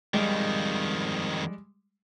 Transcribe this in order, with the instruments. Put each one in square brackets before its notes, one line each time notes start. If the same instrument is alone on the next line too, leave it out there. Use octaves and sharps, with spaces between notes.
[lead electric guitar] F2 D#3 [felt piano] G3 G#3